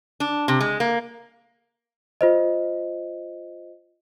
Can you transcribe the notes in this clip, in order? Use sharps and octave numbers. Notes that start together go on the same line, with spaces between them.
D4
C3
G#3
A#3
F4 C5 D#5